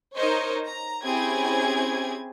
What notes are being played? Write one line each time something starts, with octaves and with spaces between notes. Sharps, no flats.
D#4 A#4 C5 C#5 D#5
A#5
C4 C#4 E4 G4 G#4 G#6